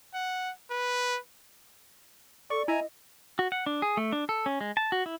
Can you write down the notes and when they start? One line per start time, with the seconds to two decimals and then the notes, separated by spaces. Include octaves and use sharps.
0.14 F#5
0.71 B4
2.50 A4 D5 C#6
2.68 E4 D#5 G#5 A#5
3.39 F#4
3.52 F#5
3.66 D4
3.82 G#4
3.97 A3
4.12 D4
4.29 A4
4.46 C#4
4.61 G#3
4.77 A5
4.92 F#4
5.06 E4